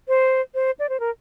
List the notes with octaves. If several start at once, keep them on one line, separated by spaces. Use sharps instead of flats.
C5
C5
D5
C5
A#4